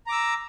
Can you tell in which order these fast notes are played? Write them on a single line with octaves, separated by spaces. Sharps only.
A#5 D6 E6